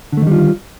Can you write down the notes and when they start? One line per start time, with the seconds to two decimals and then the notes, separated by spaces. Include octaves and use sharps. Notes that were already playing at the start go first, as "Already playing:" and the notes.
0.12 D3
0.17 A3
0.22 D#3
0.27 G3
0.32 F4